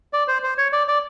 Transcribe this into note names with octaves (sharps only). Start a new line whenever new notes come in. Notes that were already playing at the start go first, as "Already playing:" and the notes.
D5
C5
C5
C#5
D5
D5